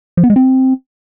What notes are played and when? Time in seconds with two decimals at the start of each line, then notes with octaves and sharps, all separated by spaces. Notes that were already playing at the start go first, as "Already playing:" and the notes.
0.17 F3
0.24 B3
0.30 G#3
0.36 C4